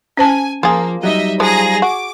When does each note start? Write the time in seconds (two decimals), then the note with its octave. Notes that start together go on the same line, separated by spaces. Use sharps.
0.17 C#4 C5 G#5 A5
0.63 F3 A#3 F4 G#4
1.03 F#3 G3 D#4 D#5 E5
1.40 F3 G#3 G#4 A#5 A#6
1.82 F#4 D6